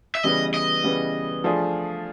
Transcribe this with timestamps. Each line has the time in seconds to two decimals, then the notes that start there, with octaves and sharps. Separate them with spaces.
0.15 E5
0.23 C#3 E3 G3 B3 D#5
0.54 D#5
0.84 C#3 E3 G3 B3
1.44 F3 A3 D4 F4 G#4